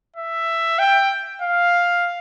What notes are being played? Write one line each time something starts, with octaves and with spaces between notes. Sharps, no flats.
E5
G5
F5